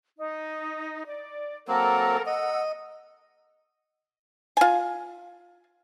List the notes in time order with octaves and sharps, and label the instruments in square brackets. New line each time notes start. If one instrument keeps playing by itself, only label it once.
[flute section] D#4
D5
[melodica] F#3 A#3 C4 [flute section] A4 A#4
[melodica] D#5 [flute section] F#5 E6
[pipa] F4 G#5